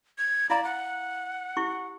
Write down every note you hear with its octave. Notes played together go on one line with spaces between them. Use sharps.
G#6
E4 D5 F5 A#5
F#5
E4 G4 C#6